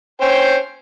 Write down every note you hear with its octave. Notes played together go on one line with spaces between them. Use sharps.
C#4 C5 G5